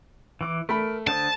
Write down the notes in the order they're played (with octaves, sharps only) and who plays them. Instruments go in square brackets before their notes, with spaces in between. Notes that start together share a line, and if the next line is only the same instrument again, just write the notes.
[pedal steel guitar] E3 D6
[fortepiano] A3 B5 [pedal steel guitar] A#4
[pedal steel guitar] D3 C5 D#6 [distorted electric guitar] A5